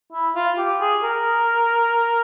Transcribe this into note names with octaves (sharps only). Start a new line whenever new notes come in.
E4
F4
G4
G#4
A#4